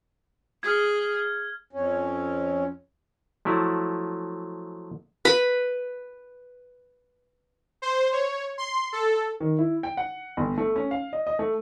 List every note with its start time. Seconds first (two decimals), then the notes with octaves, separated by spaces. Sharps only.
0.63 G#4 F6 G#6
1.73 F2 C#4
3.45 F3 F#3 A3 E4
5.25 B4 B5
7.82 C5
8.13 C#5
8.58 C6
8.93 A4
9.40 D#3
9.59 E4
9.83 G5
9.97 F#5
10.37 G1
10.58 A3
10.76 C#4
10.91 F5
11.13 D#5
11.27 D#5
11.39 A3